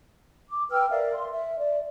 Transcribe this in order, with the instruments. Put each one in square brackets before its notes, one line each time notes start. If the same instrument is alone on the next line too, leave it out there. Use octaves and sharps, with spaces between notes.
[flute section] D6
B4 G5 E6 F6
A#4 D5 E5 F5
C6
E5
D5